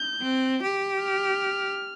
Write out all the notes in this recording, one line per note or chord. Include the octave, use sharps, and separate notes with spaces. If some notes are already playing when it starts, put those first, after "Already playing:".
Already playing: G6
C4
G4
F6